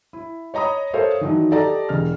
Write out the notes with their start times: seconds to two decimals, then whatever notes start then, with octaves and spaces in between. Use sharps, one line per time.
0.13 E4
0.54 C#5 D#5 A#5 B5 D#6
0.93 A4 A#4 C5 C#5 E5 F5
1.21 D#3 E3 F#3 D4 D#4
1.51 G4 A4 D5 D#5 A5 A#5
1.89 E1 F6